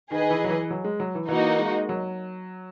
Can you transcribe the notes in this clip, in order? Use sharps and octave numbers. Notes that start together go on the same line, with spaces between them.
D#3 G#4 B4 D#5
D#3
E3
F#3
E3
F#3
G#3
F#3
E3
E3 A#3 D#4 F#4
G#3
F#3